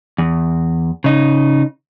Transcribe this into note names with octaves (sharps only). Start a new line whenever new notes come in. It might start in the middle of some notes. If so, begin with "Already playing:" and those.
E2
C#3 D#4